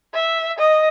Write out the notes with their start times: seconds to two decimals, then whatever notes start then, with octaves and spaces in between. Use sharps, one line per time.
0.14 E5
0.58 D#5